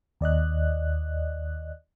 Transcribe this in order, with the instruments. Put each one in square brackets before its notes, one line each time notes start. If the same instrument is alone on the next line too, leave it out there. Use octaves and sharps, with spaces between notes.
[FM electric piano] D#2 D5 D#5 F#6